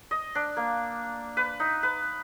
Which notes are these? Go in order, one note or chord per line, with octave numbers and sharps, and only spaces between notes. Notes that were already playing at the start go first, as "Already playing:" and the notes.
D#5
D4
A#3
B4
D#4
B4